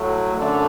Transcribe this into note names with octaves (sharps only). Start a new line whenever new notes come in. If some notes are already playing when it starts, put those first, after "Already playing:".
Already playing: A2 F#3 A3
F#2 D3 A3